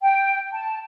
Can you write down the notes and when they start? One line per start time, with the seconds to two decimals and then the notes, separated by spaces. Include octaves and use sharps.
0.02 G5
0.51 A5